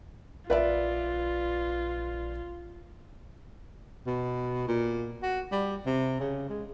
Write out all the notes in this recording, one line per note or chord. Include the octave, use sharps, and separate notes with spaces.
A#1 F4 B4 D5 E5
B2
A#2
F#4
G3
C3
C#3
G#3